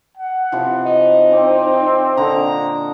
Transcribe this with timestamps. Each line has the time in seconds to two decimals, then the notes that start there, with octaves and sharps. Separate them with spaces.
0.17 F#5
0.52 C3 E3 F3
0.85 D#4
1.32 C4 D5
2.17 A#2 D3 D#5 A#5